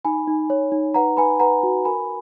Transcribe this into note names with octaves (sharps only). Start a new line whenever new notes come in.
D#4 G#5 B5
D#4
C#5
D#4
B4 F#5 A#5
B4 G#5 B5
B4 F#5 A#5
F#4
A#4 G#5 B5